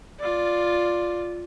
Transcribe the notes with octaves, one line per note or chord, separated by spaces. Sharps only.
F4 D5